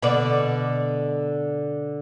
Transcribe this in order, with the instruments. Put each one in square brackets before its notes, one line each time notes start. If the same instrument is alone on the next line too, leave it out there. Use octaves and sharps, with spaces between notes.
[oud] B2 D3 D5